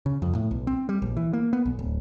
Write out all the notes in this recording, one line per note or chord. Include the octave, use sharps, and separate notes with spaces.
C#3
F2
A2
B1
C4
G3
A#1
E3
A#3
B3
B1
D1